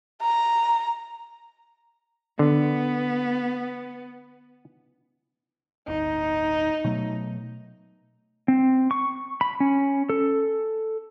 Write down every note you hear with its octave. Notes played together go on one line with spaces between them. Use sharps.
A#5
D3 B3
D1 G1 D#4
B2 F#3 A3
C4
C#6
B5
C#4
A4